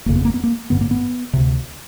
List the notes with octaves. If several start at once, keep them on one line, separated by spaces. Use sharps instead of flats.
G1 F2 C#3 A#3
B3
A#3
B3
A#3
A1 G2 D3 B3
A#3
B3
D2 C3